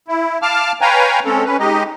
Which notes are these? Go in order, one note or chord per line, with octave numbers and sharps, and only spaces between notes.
E4
F5 A5 D6 F6
B4 C#5 F5 G5 G#5 A#5
G#3 C4 C#4 A4
C#4 B4
G#3 D#4 G4 D#5